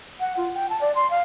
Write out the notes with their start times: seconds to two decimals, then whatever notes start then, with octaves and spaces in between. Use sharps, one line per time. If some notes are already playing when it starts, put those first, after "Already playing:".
0.20 F#5
0.37 F4
0.54 G5
0.70 A5
0.81 D5
0.95 C6
1.10 F5